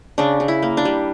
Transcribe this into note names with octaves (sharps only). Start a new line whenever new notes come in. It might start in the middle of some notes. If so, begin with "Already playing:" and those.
C#3 D4
C#3
E4
A#3
D4
G3